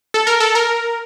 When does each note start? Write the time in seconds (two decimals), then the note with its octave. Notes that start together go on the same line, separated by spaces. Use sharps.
0.14 A4
0.27 A#4
0.40 A4
0.55 A#4